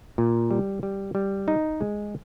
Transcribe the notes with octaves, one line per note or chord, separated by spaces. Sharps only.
A#2
G3
G3
G3
D#4
G#3